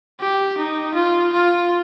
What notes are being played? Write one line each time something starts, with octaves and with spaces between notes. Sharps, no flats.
G4
D#4
F4
F4